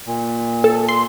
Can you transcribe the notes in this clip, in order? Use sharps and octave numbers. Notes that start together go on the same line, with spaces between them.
A#2
A4
C6